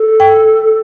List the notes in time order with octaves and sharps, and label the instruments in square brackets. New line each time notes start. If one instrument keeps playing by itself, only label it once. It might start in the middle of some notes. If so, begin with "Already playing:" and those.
Already playing: [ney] A4
[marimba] G5